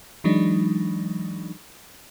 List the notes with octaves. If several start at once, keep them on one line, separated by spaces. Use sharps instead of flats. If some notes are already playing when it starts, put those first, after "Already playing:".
E3 F#3 G#3 D4 D#4